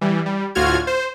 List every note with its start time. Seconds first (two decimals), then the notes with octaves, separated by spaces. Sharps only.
0.01 E3 G3
0.26 G3
0.55 D2 A2 F4 F#4 F6 G#6
0.87 C5